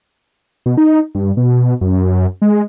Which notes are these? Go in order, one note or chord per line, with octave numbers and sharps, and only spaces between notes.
B2
D#4
G2
B2
F#2
G#3